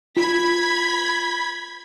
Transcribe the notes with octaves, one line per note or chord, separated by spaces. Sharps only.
F4 B5 G#6 B6